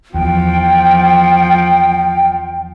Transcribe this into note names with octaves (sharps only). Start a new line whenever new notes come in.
E2 F3 G5